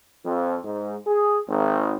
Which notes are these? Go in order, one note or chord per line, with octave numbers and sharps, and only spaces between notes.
F2
G#2
G#4
G#1